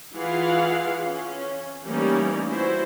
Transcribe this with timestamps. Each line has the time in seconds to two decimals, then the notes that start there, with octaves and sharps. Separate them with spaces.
0.15 E3 E4 F4 G#4 F5 F#5
1.02 C#4
1.85 E3 G3 A3 A#3 C#4 D#4
2.50 E4 F#4 C5